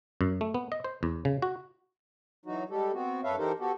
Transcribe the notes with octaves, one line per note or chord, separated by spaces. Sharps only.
F#2
A3
B3
D#5
C5
E2
C#3
F#4
E3 F#3 D#4 F#4
G3 G#3 G4 A4
B3 C4 F#4
F#2 A4 B4 C#5 E5 F5
E3 D#4 G4 A4 A#4 C5
B3 F#4 G4 A4